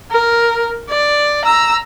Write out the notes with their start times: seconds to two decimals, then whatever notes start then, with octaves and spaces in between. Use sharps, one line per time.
0.11 A#4
0.90 D5
1.45 A#5 E6